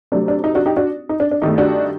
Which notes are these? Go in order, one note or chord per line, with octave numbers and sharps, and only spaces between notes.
C3 F#3 A3 D4
D4
D#4
D4 F#4
D#4 G4
D4 F#4
D#4
D4
D4
G2 D#3 A3 D#4
D4 F#4